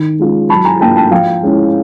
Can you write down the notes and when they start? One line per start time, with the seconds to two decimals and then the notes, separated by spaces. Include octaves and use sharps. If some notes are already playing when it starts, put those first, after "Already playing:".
Already playing: D#3
0.19 G#3 C#4 F4
0.49 F#3 A5 B5
0.65 G#5 A#5
0.80 A#3 D4 F4 G5 A5
0.96 G5 A5
1.11 F3 F5 G5
1.42 G#3 C#4 E4